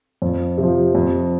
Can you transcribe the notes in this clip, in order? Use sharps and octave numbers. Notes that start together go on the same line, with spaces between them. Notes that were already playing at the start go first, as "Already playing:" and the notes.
F2
C3
F3
F2